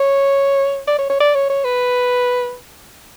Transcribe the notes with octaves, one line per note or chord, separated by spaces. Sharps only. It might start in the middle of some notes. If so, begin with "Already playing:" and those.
Already playing: C#5
D5
C#5
C#5
D5
C#5
C#5
B4